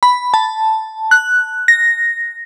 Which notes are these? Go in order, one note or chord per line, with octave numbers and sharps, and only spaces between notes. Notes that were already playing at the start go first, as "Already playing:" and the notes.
B5
A5
F#6
A#6